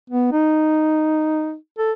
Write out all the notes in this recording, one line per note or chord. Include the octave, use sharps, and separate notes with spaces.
B3
D#4
A4